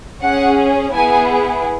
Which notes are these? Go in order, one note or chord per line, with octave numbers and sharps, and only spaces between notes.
C#4 G#4 F#5
B3 E4 G#4 G#5